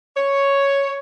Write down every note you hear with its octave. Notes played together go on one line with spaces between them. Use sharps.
C#5